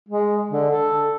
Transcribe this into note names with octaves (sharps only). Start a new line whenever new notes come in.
G#3
D3
A4